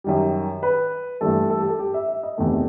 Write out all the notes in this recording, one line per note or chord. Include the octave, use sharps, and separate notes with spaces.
F#2 D#3 G3
B4
G2 E3 A3 A4
A4
G4
A4
G4
E5
E5
D#5
E2 C3 D#3 A3